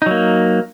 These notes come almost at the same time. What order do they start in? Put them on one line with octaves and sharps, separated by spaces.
D#4 F#3 A#3